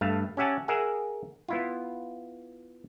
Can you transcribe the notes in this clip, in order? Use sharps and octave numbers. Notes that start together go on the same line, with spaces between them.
G2 A3 F5
C#4 G4 E5 F#5 G#5 A5
G#4 A#4 E5 F#5 G#5
B3 E4 F4